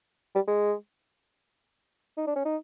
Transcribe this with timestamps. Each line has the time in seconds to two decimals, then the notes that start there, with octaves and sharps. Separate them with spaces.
0.35 G3
0.47 G#3
2.17 D#4
2.27 D4
2.36 C#4
2.45 D#4